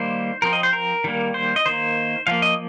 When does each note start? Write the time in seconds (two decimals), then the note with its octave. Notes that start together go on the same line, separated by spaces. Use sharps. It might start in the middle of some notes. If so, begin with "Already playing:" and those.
Already playing: D#3 G3 A#3 C5
0.42 F3 C4 A#4
0.53 D#5
0.63 C5
0.73 A#4
1.04 D#3 G3 A#3
1.34 C5
1.56 D#5
1.66 D#3 A#3 C5
2.27 F3 A#3 F5
2.42 D#5